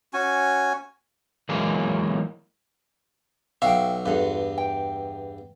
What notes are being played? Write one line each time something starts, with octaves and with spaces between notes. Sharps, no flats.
C#4 F#4 G#5
E3 F#3 G#3 A#3 G#4
B1 F#4 E5 F5 G5
E2 G2 F4 A4 B4
G5